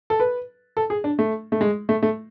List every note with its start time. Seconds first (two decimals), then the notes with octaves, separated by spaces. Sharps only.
0.10 A4
0.20 B4
0.77 A4
0.90 G#4
1.04 D4
1.19 A3
1.52 A3
1.61 G#3
1.89 A3
2.03 A3